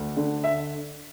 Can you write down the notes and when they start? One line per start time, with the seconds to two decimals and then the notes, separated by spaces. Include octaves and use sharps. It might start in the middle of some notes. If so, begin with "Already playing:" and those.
Already playing: D2
0.17 D3
0.44 E5